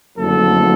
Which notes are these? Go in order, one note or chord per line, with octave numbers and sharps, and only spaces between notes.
F#1 F2 D3 F#3 A3 A4